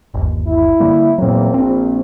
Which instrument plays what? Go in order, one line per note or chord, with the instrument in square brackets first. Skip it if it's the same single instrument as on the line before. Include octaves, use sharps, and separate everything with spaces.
[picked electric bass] G1 D#2
[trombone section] E4
[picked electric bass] D3 G3 A#3
[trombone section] E2 A#3 C4 [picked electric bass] A#2 F#3
[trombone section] A#1 [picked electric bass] C4